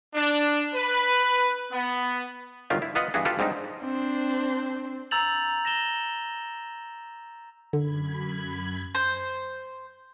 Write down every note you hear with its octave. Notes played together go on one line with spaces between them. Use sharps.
D4
B4
B3
G1 D#3 F#3 F4 G4
E4
B3 F4 B4 D#5 F#5
G2 E3 B3 F#4 G#4
F4 G4 A4 B4
G#2 G3 C4 D4 D#4
C4 D4 C5
A#5 E6 G6 A6 F7 F#7
A#6 E7 G7
F#2 D3 B5 G#6
C5